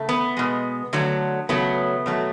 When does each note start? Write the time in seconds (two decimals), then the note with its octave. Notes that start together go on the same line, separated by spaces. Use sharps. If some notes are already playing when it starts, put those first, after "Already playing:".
Already playing: C#3 A3
0.09 B3
0.37 B2 G#3
0.93 D3 F#3 A3
1.49 C#3 F#3 A3 B3
2.06 B2 F#3 A3